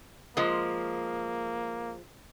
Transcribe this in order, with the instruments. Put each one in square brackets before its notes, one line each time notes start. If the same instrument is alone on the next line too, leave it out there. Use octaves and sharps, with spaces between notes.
[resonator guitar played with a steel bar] F3 G#3 [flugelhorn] A#3